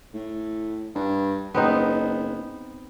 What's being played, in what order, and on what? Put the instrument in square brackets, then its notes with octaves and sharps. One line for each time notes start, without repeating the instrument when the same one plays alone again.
[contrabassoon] A2
G2
[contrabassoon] F#1 [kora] B3 C4 D#4